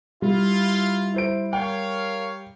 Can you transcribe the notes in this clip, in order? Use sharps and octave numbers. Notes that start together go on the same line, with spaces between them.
G3 E4 F4
E4 C5 D7
A#4 C#5 F5 G5